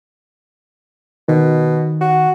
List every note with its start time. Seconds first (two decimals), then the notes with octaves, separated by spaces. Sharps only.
1.28 B2 D#3
2.01 F#4